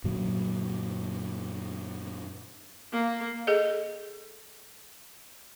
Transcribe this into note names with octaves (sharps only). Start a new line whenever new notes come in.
F#2 A#2 D3 F#3
A#3
G#4 A4 D#5